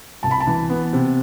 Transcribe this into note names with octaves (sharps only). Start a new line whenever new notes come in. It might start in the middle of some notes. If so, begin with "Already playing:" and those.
C2 A5
B5
A5
E3
B3
C3